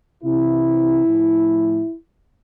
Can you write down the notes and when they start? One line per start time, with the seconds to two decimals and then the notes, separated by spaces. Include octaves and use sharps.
0.23 C3 E3 E4
1.05 A2 F3